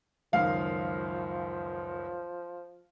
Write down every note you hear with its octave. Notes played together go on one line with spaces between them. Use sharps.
C#2 F#2 D#3 F3 F5